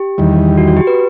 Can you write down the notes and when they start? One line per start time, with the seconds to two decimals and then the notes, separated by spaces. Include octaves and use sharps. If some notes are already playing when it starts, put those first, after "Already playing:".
Already playing: G4
0.18 E2 D#3 G3
0.57 F#4
0.67 F#4
0.77 G4
0.87 B4